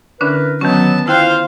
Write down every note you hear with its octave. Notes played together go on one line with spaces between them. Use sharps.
D3 C#4 D4 E4 A#4 B4
D#3 F#3 B3 C#4 A5
E4 F4 C5 F5 G5 F6 F#6